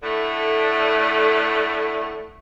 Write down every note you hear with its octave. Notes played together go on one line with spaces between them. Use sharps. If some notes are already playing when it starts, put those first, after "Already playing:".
A2 D3 A3